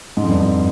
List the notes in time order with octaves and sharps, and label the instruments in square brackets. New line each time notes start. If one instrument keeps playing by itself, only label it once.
[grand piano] G#2
F2
G2
F2